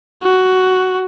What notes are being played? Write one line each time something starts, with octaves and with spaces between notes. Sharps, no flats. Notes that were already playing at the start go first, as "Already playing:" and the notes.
F#4